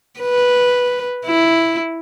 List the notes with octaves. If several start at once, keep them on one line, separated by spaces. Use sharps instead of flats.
B4
E4